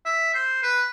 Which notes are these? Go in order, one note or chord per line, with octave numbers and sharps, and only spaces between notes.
E5
C5
B4